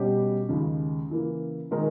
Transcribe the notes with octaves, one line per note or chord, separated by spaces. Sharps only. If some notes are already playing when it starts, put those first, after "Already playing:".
Already playing: B2 G3 C#4 G4 C#5
D#2 C#3 G#3
C#3 E3 A#3
D#3 G#3 D#4 A#4